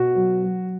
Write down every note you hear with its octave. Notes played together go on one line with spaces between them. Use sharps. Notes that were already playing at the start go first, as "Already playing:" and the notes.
Already playing: B2 F#4
F#3
F#3